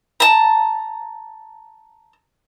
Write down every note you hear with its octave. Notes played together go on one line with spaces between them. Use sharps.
A5 A#5